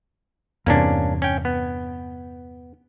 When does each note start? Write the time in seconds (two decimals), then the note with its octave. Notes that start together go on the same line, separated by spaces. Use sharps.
0.66 E2 G2 C3 A#3 C#4 D4
1.22 C#4 G5
1.45 B3